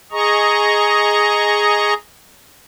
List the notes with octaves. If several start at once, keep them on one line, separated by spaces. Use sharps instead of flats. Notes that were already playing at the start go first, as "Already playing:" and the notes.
G#4 D#5 A#5 C#6